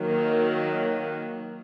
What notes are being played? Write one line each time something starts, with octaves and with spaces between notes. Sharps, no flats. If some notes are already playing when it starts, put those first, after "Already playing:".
Already playing: D#3 F#3 A#3